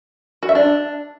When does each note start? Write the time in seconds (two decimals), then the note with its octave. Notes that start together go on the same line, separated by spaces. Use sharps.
0.43 F#4
0.49 E5
0.55 D4